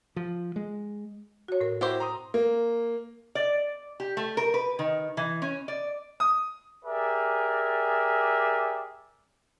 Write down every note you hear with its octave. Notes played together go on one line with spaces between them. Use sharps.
F3
G#3
F#4 C#5
A2 A#4
C4 E4 F#4 G4 C5 E6
A#5 C6 D#6
A#3
D5
G4
A3
A#4
B4
D#3
E3
C#4
D5
D#6
G4 G#4 A#4 D5 E5